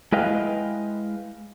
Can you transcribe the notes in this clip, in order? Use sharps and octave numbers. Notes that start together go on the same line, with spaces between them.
G#3 E4 B4 D#5 F5 G5